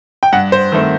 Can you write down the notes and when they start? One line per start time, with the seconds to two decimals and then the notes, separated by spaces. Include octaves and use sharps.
0.23 G5
0.32 G2 F#5
0.52 C5
0.72 D#3 A3 C4